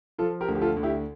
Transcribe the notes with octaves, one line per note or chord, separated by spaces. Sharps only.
F3 F4 A4
G4 A#4
D2
G4
F4 A4
D2
E4 G4